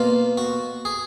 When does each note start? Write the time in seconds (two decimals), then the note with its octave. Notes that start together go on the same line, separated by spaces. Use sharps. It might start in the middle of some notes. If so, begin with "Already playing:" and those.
Already playing: B2 A#3 F4
0.37 F#4
0.85 G#4